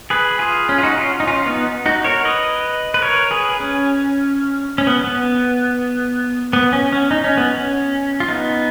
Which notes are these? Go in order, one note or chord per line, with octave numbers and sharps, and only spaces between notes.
G#4 B4
F4 G#4
C#4
F4
D#4 F#4
C#4 F4
D#4
C#4 F4
B3 D#4
D#4 F#4
A#4 C#5
B4 D#5
B4
A#4 C#5
G#4 B4
C#4
C#4
B3
B3
B3
C#4
C#4
D#4
C#4
B3
C#4
F4
B3 D#4